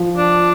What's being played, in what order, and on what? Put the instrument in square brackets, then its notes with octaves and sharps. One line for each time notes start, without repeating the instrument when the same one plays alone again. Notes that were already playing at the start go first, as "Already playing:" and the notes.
Already playing: [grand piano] F3
[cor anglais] D4